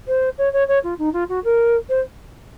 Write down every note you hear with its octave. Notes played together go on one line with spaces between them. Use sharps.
C5
C#5
C#5
C#5
F4
D#4
F4
F#4
A#4
C5